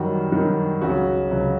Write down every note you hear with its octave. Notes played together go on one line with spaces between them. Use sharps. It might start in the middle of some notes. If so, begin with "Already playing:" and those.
Already playing: F#2 D#3 G3 F#4
F#2 D#3 G3
C#2 C#3 F#3 F#4
C#2 C#3 F#3